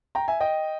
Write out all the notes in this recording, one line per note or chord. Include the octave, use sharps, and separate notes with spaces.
G5 A#5
E5 G#5
D#5 G5